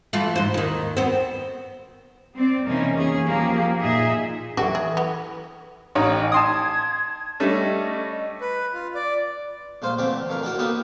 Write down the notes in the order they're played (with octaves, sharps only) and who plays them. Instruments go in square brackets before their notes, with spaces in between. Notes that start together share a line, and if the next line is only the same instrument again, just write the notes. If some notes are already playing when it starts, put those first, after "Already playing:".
[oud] E3 A3 F4
G#2 C5
D#2 D#3
B3 C4
[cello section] C4 D5
C3 E3 A#3 C#4 D#4
E2 C#4 G#4
F3 A#3 G4 G#4
A#2 D#4 G#4 D#5 E5
[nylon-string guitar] E3 A4 G5 [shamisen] F#4
[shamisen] G#4
B3
[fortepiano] A1 D#4 C#5 [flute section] G5 G#5
[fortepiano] A5 C6 D#6 [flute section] G#6
[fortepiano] G3 A3 C#4 [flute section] D#5
[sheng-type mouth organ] B4
F4
D5
[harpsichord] A#1 G#3 F4 C5
E2 D3 A3 C4 G4 D6
F2 E3 A#4 A#5
D4 F#4 A#4 D5 G5
A#3 B3 D#4 G4 A4 A#4